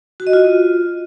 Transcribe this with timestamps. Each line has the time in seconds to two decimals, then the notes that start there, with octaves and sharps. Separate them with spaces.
0.20 F#4
0.27 D#5
0.33 F4